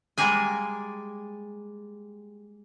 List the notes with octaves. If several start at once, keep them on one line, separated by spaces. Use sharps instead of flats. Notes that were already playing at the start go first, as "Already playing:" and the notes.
G3 G#3 A#3 G4 G#4 G#5